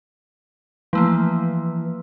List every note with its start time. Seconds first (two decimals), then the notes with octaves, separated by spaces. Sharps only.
0.93 E3 F3 A3 A#3